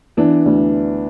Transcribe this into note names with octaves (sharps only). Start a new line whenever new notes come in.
E3 B3 D4
D2